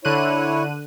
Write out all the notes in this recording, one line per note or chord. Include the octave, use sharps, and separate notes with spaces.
D3 E4 C#5 F#6 D#7